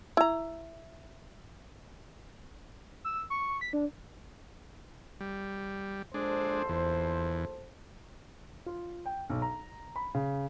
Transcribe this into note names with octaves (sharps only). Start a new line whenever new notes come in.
E4 A#5
E6
C#6
B6
D4
G3
A#1 G#3 D4 A4 C5
E2
F4
G5
B1
A#5
B5
C#3